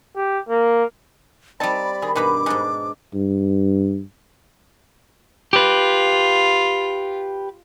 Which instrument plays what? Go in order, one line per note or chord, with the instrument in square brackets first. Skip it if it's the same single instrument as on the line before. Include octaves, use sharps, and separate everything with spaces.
[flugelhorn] G4
A#3
[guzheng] G3 C4 [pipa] D#4 A5 [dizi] D5 [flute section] B5
[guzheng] D#3 [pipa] G#4
[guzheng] G2 B2 [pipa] D#4 G#4 B4 [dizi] D6
[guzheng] G#2 B2 D4 [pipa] D#4 G#4
[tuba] G2
[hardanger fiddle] F4 [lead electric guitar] G4 B4